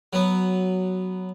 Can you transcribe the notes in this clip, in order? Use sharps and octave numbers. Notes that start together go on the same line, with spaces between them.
F#3 B3